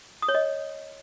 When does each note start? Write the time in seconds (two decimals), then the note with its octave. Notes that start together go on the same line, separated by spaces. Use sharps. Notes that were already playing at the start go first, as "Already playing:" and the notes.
0.22 D#6
0.28 C#5
0.34 D#5